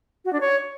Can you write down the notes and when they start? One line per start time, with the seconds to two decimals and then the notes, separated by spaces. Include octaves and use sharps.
0.25 F#4
0.33 D4
0.41 C#5